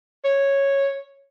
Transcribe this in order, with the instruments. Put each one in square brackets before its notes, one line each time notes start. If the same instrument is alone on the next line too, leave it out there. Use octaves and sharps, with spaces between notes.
[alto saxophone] C#5